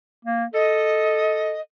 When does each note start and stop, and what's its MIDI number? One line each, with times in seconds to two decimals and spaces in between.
0.25 0.45 58
0.54 1.57 69
0.54 1.61 75